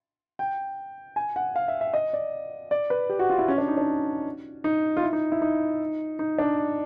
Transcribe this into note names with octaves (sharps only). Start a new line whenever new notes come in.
G5
G#5
F#5
F5
E5
E5
D#5
D5
D5
B4
G4
F#4
F4
E4
C#4
D4
D#4
D4
D#4
F4
E4
D#4
E4
D#4
D#4
D4